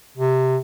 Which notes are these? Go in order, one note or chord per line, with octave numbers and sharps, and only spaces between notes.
C3